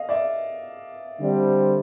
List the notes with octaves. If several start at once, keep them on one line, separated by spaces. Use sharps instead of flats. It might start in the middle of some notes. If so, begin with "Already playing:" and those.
Already playing: D#5 F5
D5 E5
D3 G3 C4